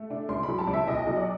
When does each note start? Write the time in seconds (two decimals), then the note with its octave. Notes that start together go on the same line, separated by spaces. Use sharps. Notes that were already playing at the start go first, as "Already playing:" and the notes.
Already playing: A3
0.10 D4
0.29 C#2 C6
0.43 B5
0.48 F#3
0.59 A5
0.67 C#2
0.73 E5
0.87 B1 D#5
1.07 F#3
1.16 D5